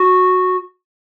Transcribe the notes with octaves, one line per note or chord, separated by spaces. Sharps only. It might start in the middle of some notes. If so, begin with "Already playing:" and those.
Already playing: F#4